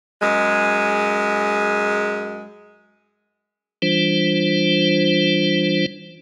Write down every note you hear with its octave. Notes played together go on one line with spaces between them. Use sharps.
F#2 G#3
E3 G3 D4 F4 C5